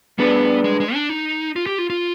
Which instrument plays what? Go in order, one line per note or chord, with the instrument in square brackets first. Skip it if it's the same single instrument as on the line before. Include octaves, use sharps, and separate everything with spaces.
[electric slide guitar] G3 D4 G#4 B4 [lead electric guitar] B3
[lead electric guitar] G#3
G#3
D4
D#4
F4
G4
F4
F4